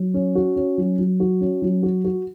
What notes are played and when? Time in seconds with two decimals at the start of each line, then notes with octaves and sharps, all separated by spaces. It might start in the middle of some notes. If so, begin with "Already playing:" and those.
Already playing: F#3
0.14 C#4
0.35 F#4
0.56 C#4
0.78 F#3
0.98 F#3
1.20 F#4
1.41 C#4
1.62 F#3
1.83 F#4
2.05 F#4